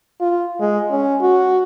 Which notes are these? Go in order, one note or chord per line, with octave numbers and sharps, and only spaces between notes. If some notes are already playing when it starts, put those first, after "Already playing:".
F4
G#3
C#4
F#4